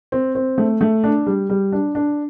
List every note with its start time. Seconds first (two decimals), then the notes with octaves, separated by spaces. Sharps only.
0.12 C4
0.35 C4
0.58 A3
0.81 A3
1.04 D4
1.27 G3
1.50 G3
1.72 D4
1.95 D4